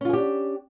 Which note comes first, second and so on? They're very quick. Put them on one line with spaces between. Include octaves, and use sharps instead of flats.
C#4 F4 G#4 G4 D4